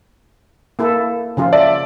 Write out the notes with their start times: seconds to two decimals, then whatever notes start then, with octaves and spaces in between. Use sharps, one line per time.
0.79 A#3 E4 A4
1.37 C#3 F3 F4
1.53 D5 E5 A5